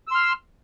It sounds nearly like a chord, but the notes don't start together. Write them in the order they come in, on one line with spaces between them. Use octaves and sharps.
E6 C6 F6